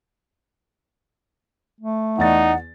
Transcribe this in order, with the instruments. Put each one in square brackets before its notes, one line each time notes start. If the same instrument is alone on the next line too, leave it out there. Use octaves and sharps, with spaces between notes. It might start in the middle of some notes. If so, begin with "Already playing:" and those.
[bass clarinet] A3
[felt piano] E2 D5 A6 [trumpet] D#4 [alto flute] F#5